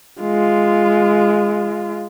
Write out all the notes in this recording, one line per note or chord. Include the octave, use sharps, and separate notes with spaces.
G#3 F4